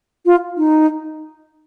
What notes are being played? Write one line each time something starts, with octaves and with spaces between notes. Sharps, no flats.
F4
D#4